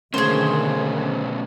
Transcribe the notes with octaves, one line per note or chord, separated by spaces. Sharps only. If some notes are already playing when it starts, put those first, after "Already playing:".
B2 D3 D#3 A3 A#3 C#4 G#4 C5